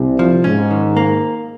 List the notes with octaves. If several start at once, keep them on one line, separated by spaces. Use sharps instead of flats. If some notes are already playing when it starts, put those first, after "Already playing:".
Already playing: C2 C3
F3
G#2 C#4
D#3
A#3